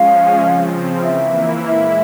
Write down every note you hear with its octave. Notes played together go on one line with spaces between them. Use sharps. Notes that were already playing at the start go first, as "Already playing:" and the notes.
Already playing: F3 G#3 C#4 F5
C#3 F3 C4
E3 A#3 E4 E5
A#2 G#3 E4 E5